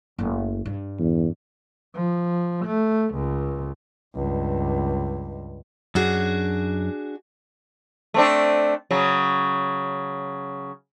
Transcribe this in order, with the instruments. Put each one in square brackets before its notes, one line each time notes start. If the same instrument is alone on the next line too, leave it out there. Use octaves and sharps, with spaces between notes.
[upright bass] F#1 A3
G2
[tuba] E2
[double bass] F3
A3
C#2
C#2 G2
[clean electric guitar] F#2 [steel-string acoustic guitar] D4 F#4 G#4
[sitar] A3 C4 D4
C#3 F#3